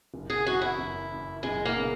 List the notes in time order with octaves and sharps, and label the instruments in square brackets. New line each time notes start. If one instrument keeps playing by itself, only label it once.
[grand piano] F#1
[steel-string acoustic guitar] G#4
[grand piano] F#2 E3 [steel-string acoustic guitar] F#4
[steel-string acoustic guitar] E4
[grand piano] F#1
F#2 E3
[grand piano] F#1 [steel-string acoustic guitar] G#3
[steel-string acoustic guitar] A#3
[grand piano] C#3 G#3 B3